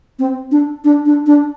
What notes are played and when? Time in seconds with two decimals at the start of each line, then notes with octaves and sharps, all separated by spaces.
0.19 C4
0.51 D4
0.84 D4
1.06 D4
1.27 D4